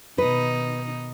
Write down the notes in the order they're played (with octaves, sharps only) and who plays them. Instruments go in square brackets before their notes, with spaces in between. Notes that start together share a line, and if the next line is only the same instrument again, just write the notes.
[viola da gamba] B2 D#3 D#4 [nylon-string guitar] B4